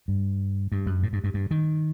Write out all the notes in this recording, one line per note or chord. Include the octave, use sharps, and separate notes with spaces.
G2
G2
F#2
A2
G2
G2
G2
D#3